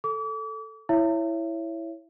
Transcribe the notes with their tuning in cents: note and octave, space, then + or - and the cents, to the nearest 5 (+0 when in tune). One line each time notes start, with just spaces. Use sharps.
A4 +0 D6 -40
E4 +0 C#5 +0 E5 +25